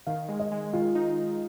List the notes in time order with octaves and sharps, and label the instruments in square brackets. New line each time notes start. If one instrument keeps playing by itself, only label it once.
[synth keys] D#3 [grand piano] F5
[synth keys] G#3
[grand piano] D#5
[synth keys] G#3
[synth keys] D#3 [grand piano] F4
[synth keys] D#4